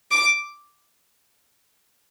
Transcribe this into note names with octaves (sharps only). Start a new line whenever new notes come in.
D6